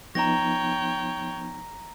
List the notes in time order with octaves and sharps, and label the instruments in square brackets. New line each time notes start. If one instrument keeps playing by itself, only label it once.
[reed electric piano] F3 B3 D#4 [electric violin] C#5 G5 [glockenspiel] A#5 A#6